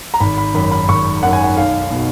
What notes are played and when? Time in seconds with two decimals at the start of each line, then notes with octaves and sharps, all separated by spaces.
0.14 A#5
0.20 G#1 B5
0.38 B5
0.54 F#2 D#3 B5
0.71 B5
0.89 G#1 C#6
1.23 F#2 D#3 F#5
1.33 G#5
1.43 F#5
1.57 B1 F5
1.91 B2